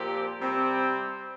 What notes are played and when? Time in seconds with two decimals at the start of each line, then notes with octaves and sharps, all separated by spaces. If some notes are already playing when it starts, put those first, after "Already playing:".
Already playing: A#2 F3 C4 G4
0.40 C3 G3 C4